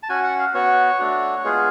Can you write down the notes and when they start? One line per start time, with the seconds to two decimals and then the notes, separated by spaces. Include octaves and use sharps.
0.03 A5
0.09 C#4 F#4 G#5
0.24 F#5
0.39 F5
0.54 B3 F#4 C#5
0.99 A3 D4 F#4
1.44 G#3 B3 F4 G#4